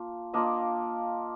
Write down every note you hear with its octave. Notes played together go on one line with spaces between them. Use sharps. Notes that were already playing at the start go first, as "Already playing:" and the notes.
Already playing: A#3 D4 F4
A#3 D4 F4 D#5